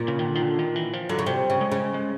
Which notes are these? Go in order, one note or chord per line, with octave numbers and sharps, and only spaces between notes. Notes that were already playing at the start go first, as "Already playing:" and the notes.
Already playing: A#2
C#3
D#3
D3
D#3
D3
D#3
E3
F3
D3 F#3
C#3
C3 G3
C#3
G#3
C#3
G#3